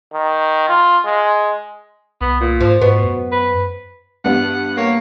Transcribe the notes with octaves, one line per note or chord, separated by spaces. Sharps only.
D#3
F4
G#3
C2 B3
A#2
G#2 F3
G#2 B2 B3
F#2
B4
G2 B3 F#5
A#3 C#5